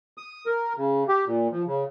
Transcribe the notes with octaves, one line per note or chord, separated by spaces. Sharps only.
D#6
A#4
C#3
G4
A#2
F3
C#3